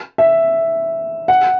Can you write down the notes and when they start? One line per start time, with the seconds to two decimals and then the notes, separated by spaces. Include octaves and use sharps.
0.18 E5
1.28 F#5